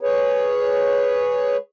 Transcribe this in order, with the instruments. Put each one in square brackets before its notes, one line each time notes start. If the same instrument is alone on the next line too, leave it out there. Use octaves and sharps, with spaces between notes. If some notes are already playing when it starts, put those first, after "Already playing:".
[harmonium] G#4 B4 C#5